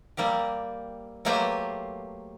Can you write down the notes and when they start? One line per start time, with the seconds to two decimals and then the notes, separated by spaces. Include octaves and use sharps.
0.17 G3 A#3 C4 G4
1.25 F#3 A3 A#3 G4 B4 C5